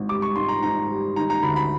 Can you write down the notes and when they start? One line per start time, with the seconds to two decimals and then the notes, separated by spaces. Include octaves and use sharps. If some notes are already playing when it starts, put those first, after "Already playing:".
Already playing: G#1 G#2
0.09 G3 D6
0.22 C#6
0.36 G#2 C6
0.49 A#5
0.63 G#2 A#5
0.89 G3
1.16 D#3 A#5
1.30 A#5
1.43 D2 B5
1.56 B5